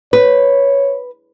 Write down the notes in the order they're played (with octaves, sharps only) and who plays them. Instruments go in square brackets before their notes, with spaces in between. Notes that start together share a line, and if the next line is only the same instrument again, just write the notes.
[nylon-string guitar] B4 [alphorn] C#5